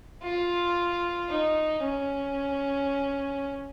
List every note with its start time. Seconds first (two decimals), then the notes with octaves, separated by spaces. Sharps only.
0.23 F4
1.30 D#4
1.83 C#4